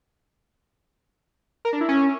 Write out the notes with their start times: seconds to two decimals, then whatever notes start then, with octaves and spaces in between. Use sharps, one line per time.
1.65 A#4
1.73 D4
1.81 E4
1.89 C#4